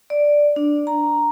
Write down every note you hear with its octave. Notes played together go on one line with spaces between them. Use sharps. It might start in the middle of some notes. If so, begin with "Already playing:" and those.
D5
D4
A#5